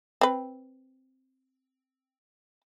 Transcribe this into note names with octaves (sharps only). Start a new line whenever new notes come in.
C4 B4